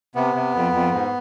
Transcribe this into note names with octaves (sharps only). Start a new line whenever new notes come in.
C3 B3
C3
F2
F2
G#2